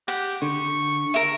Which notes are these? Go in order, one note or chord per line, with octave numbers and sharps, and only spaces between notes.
G4 F#5
D3 C#6
A#4 E5